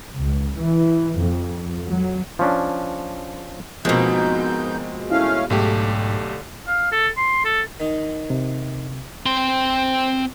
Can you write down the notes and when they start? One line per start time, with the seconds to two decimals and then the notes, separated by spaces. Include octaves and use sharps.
0.15 C#2
0.57 E3
1.18 F2
1.88 F#3
2.39 F3 C#4 D4
3.85 G#2 B2 F3 G#3 A#3 C4 D#4 G6
5.11 A3 C#4 E4 F5
5.50 B1 G#2 D3 A3 G4
6.67 F5
6.92 A4
7.17 C6
7.45 A4
7.80 D#3 D#4
8.30 C3
9.26 C4 C6